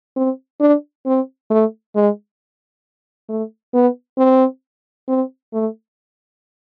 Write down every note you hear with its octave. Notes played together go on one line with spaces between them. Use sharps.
C4
D4
C4
A3
G#3
A3
B3
C4
C4
A3